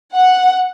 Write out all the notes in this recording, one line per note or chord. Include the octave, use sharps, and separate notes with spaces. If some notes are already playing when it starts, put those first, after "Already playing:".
F#5